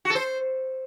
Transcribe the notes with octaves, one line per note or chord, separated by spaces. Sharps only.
F#4
A4
C5